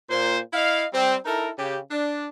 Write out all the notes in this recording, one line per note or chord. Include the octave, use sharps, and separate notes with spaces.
A#2 C5
E4 D#5 F5
G3 C4
D#4 E4 A4 A#4
C#3 G4
D4